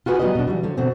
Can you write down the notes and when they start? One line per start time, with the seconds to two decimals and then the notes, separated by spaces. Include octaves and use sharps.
0.06 F4 F#4 G#4 B4 F#5
0.20 F#3 G3 B3 B4 D#5
0.35 B2 D4
0.47 E3 F#3 G3
0.63 D3 F3 F#3
0.77 B2 D3 C4